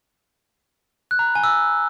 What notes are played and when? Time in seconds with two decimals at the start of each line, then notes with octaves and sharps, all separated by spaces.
1.11 F#6
1.19 A#5
1.27 B5
1.35 G#5
1.44 E6